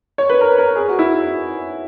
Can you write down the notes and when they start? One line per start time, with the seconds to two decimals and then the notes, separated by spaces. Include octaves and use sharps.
0.18 C#5
0.30 B4
0.41 A#4
0.58 A#4
0.76 G#4
0.88 F#4
0.99 E4